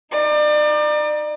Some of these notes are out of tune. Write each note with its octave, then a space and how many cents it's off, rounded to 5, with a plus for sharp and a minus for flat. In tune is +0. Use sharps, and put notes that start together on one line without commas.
D#4 +20 D5 +35